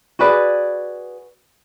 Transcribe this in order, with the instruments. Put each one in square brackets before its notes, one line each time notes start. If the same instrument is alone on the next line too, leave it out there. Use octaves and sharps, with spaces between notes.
[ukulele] F#4 G#4 B4 D5